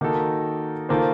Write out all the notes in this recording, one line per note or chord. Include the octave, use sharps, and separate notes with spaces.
D#3 A#3 D#4 F#4 A4
D#3 A#3 F4 A4 C5